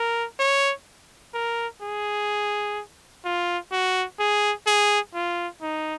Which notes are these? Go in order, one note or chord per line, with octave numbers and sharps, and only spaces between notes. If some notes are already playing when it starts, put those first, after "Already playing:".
Already playing: A#4
C#5
A#4
G#4
F4
F#4
G#4
G#4
F4
D#4